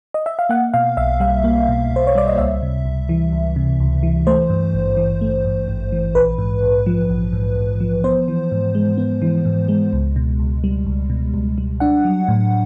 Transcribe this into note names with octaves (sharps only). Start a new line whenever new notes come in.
D#5
E5
F5
A#3 F#5
B2 F5
B1 E5
G3 F5
A#3
B2
B1 C5
C#5
G3 D5
D#5
C#2 E5
C3
C#2
E3
C#2
C3
C#2
E3
A3 C5
G2
G#1
E3
A3
G2
G#1
E3
A#1 B4
G#2
A#1
F3
A#1
G#2
A#1
F3
B3 C5
E3
G#2
G#3
B3
E3
G#2
G#3
C#2
B2
C#2
G3
C#2
B2
C#2
G3
D4 F#5
F#3
A2